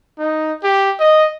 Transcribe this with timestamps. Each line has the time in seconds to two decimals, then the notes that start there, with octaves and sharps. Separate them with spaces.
0.18 D#4
0.64 G4
1.00 D#5